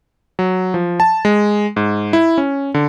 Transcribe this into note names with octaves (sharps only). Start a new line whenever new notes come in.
F#3
F3
A5
G#3
G#2
E4
C#4
D3